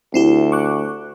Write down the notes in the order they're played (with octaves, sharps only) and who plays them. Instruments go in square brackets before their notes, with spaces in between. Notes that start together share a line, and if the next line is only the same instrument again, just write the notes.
[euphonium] D2 [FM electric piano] C4 E4 G4
[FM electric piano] C#6 D6 F#6